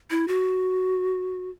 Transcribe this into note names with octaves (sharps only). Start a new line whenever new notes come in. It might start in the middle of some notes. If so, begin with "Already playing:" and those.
E4
F#4